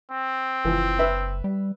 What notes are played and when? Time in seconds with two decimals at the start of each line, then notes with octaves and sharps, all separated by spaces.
0.12 C4
0.65 F#1 E3 F3
0.99 B4 E5
1.44 G3